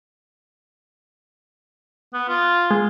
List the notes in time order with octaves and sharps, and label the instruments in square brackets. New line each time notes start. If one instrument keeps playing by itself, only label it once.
[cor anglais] B3
F4
[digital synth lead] G#3